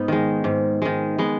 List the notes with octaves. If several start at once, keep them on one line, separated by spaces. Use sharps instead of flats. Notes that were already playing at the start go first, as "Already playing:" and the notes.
Already playing: G#2 B3 D#4
D#3 G#3
G#2
D#3 G#3
G#3 B3